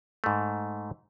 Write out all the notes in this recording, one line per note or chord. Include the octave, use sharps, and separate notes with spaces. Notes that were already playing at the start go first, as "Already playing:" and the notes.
G#2 A3